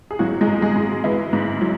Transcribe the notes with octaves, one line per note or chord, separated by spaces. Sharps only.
G#4
G#2 F#3 F#4
G#3 G#4
G#2
G#3 G#4
G#2
E3 B3 E4
G#2
F#3